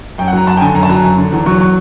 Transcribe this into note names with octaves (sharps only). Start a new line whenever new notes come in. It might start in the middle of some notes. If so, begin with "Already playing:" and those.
F#2 G5
F#5
F#3 A#5
F#2 A5
G5
D3 G#5
F#2 A#5
A5
F#3 A#5
F#2
D3
E2
F#3 C#6
C#6